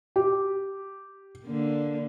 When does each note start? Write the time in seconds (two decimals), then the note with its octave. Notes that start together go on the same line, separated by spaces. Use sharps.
0.16 G4
1.45 D3 A#3